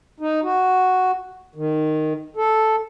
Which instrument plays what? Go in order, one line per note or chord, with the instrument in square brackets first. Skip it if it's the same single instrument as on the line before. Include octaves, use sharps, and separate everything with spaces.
[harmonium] D#4
F#4
D#3
A4